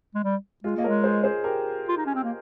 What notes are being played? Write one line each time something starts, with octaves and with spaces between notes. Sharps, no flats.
G#3
G3
G#3 F4 G#4
A#3 D#5
G#3 A#4 C#5
G#4 C5
G#4 C5
G4 A#4
F4
D#4
C#4
C4
A#3